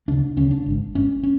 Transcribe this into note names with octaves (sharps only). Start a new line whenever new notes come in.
D2 C#3 D4
D2 C#3 C#4
D4
G#1 G#2
G#1 G#2 C#4
C#4